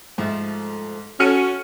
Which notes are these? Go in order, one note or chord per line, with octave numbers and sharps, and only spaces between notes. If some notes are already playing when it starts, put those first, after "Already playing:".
G#2 F3 A3
C#4 F#4 A4 F6 C#7 D#7